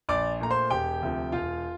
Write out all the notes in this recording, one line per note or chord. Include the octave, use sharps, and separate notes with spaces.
A#1 D5 D6
A#2 A3 A#5
C5 C6
E1 G4 G5
D2 C3 F3
E1 F4 F5